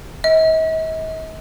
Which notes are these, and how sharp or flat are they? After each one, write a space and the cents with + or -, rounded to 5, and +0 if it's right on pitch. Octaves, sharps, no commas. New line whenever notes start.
D#5 +45